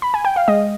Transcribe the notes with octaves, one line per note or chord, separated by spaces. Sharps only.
B5
G#5
G5
F5
G#3 D#5